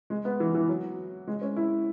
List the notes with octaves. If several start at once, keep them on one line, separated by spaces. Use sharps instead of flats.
G#3
B3
E3
E3
F#3
G#3
C#4
E4